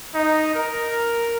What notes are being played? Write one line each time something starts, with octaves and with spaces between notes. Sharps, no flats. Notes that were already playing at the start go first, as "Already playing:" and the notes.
D#4
A#4